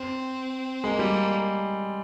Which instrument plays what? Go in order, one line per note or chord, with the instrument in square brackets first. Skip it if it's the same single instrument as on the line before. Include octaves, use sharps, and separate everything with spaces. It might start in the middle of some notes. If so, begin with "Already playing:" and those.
Already playing: [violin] C4
[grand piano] G#3 [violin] A#3
[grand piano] G3